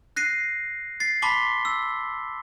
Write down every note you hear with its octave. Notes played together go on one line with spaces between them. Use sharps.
F#6 A#6 C7 D#7
A6 C7
A5 B5 C6 D6 B6 G7
E6